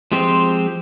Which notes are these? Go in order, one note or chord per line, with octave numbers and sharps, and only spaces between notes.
F3 G#3 C4 G4 C5